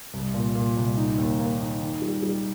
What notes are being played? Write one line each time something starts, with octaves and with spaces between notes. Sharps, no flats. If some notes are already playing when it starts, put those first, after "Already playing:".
C2
A#2
A#2
C2
D#4
D#2
A#3
D#4
D#3
G3
G3